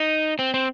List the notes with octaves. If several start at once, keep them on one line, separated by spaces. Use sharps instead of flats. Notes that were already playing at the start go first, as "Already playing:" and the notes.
Already playing: D#4
C4
C4